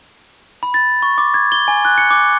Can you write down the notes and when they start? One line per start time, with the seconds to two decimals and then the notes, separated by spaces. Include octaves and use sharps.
0.63 B5
0.74 A6
1.03 C#6
1.18 D6
1.34 G#6
1.52 G7
1.68 G#5
1.85 F#6
1.98 C#7
2.11 D6